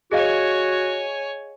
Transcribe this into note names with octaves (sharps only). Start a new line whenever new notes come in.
F#4 G#4 C#5 D#5 F5 G#5